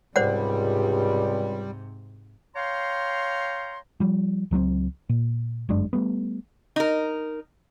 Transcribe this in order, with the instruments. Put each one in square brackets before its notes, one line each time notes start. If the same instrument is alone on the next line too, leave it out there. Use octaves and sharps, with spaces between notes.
[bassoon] C#2 [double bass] G#2 C3 [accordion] G3 [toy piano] C5 D5 F#5
[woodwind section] C#5 F5 G5 A#5 C6
[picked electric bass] F3 G3
C#2 F#3 A3 C4
A#2
G1 F#2 G#3 D4
G3 A3 B3
[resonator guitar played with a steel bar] D#4 A#4